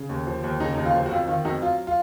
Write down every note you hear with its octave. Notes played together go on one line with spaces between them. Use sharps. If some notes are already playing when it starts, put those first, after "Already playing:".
Already playing: C#3
D#2
F3
D#2
C#3 D#4
D#2 D#4
F4
F3
F#4
F2 F4
D#3 F4
F2 D#4 F#4
F#3 F4
F4